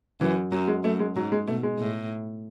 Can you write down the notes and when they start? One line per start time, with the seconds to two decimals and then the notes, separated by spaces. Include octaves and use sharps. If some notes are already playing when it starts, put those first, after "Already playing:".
0.21 F#2 E3
0.52 F#2 F#3
0.68 G#3
0.84 F#2 A3
0.99 G#3
1.16 G#2 F#3
1.32 G#3
1.48 B2 A3
1.63 G#3
1.79 A2